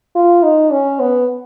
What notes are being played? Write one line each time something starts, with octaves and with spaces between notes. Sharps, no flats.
F4
D#4
C#4
B3